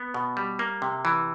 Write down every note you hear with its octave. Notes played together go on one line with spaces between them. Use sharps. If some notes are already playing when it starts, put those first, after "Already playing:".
Already playing: B3
B2
G3
A#3
C3
E3